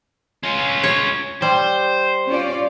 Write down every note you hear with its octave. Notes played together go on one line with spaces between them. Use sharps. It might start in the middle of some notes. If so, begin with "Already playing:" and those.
C#4 F4
C#5
G3 C5
C#4 F4 D5